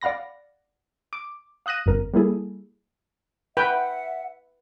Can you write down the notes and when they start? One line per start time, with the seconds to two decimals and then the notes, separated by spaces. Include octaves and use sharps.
0.01 D5 F5 F#5 B5 A#6
1.13 D6
1.66 F5 D#6 F#6 A#6 D#7
1.86 G1 F2 A#4
2.14 G3 A#3 E4 G#4 A4
3.57 B4 E5 F#5 G5